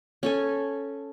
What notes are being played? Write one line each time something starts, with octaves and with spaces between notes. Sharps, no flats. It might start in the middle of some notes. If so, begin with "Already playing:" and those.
C#4 A4 G#5